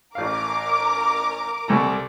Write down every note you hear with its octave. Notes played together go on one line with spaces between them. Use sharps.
A1 A#4 F5 D6
C2 A4 A#5